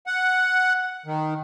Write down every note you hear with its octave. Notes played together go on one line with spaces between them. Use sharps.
F#5
D#3